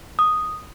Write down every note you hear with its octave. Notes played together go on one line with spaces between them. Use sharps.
D#6